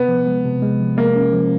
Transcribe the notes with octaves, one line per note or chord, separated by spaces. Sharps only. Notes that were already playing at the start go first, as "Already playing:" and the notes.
Already playing: C3 B3
F3
G#3
C3
G#3
F3
G#3 A#3
C#4
F3